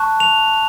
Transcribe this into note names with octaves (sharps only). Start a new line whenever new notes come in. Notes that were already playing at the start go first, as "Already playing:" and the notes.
Already playing: A5 C#6 F#6
F7